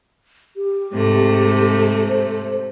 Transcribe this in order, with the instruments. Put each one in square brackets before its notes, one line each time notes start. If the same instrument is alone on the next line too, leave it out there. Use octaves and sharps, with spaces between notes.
[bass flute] G4
[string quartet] G#2 C3 A3
[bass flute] C5